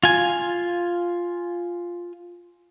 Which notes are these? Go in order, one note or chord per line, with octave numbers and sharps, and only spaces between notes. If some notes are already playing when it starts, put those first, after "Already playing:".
F4 G#5